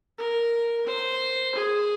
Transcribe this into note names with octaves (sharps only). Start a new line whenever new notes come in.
A#4
C5
G#4